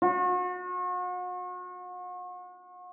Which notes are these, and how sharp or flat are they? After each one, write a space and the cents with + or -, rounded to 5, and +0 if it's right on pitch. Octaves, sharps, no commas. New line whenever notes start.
F#4 -40